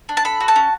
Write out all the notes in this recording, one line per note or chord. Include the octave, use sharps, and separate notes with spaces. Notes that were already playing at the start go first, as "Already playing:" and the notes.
D4
A5
A4 B5
F#4
A5
C#4